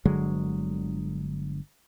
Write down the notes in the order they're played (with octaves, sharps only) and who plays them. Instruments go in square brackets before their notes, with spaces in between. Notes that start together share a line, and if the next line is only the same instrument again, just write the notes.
[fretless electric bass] G1 D3 F#3 G#3